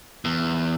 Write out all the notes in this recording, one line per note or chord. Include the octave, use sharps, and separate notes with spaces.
E2